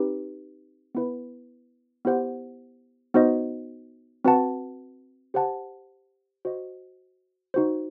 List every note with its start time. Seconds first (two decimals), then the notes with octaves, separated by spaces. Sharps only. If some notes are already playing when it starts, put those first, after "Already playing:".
Already playing: C4 D#4 G4 B4
0.95 B3 E4 B4
2.05 B3 E4 G4 C5 F#5
3.14 B3 D#4 F#4 C5 D#5
4.25 C4 F#4 B4 F#5 A5
5.34 G4 C5 F#5 A5
6.45 F#4 C5 D#5
7.54 D#4 F#4 C5